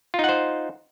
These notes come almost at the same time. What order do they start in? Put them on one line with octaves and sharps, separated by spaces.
F4 D#4 F#5 C5